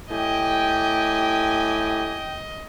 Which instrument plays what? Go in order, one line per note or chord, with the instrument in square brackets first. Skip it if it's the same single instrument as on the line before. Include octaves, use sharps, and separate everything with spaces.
[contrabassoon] A2 [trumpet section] G4 G#5 [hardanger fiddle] D#5 [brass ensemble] G5